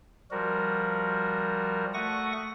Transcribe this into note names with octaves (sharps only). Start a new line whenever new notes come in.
F3 G3 F#4 A#4
A3 F#5 C#6 D#6 A#6